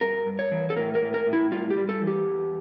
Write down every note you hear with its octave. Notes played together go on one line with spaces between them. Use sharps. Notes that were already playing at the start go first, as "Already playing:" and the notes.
G2 A#4
G2
C#5
E3
A4
A2 A#4
A#4
A2
A#4
A2
E4
G3 F4
G4
G3
A4
E3
G4
E2